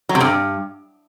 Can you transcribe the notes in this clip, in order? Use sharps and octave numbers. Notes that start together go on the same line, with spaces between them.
F#3
C3
G2